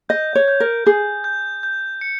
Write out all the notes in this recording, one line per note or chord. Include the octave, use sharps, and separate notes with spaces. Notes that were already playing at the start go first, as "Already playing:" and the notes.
D#5 G6
C#5
G6
A#4
G#4 G6
G6
G6
C#7